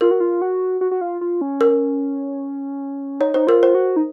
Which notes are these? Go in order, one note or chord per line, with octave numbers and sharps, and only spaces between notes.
F4 A#4
F#4
F4
F#4
F#4
F#4
F4
F4
C#4
A#4
D#4 C#5
D#4 C5
F4 A#4
C5
F#4
D#4